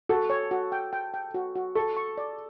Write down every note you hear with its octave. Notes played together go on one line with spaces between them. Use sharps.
F#4 A4
C#5
F#4
G5
G5
G5
F#4
F#4
A4 C#6
C#6
D5